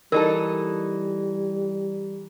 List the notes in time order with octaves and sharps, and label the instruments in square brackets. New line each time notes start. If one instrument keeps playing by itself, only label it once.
[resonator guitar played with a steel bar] E3 D#4 A4 [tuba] G3 [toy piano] A#4